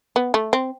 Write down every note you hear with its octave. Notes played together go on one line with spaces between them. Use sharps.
B3
A3
C4